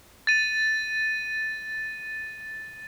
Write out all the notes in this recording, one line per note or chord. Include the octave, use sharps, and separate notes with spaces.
A6 D#7